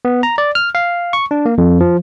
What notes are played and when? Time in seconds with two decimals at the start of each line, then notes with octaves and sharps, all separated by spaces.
0.05 B3
0.23 A#5
0.38 D5
0.55 F6
0.75 F5
1.13 C#6
1.31 D4
1.46 A#3
1.58 F2
1.80 F3